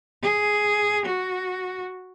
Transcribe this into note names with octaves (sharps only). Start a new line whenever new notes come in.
G#4
F#4